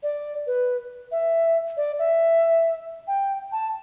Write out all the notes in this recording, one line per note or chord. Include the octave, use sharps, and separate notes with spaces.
D5
B4
E5
D5
E5
G5
A5